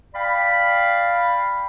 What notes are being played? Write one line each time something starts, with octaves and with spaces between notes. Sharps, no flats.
D5 F5 G5 B5